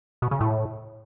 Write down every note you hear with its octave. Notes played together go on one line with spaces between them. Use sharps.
B2
C#3
A2